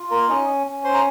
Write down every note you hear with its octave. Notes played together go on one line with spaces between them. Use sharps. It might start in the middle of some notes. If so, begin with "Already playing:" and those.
Already playing: F4
A#3 A#4
C#4 D#4 D#5
C#4
C5 C6
A#5